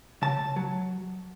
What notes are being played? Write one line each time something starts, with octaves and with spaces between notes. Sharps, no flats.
C#3 A5
C#2
F#3